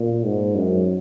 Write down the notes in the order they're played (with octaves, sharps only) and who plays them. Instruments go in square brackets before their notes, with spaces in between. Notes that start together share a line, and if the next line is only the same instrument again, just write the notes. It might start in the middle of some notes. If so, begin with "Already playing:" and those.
Already playing: [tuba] A#2
G#2
F#2